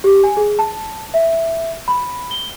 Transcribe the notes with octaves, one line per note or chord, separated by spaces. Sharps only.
G4
G#5
G#4
A5
E5
B5
G7